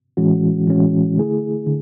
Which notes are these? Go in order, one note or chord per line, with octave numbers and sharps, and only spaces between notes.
A2 E3 G#3 C#4 F#4
A2 E3 G#3 C#4 F#4
D3 A3 E4 G#4
D3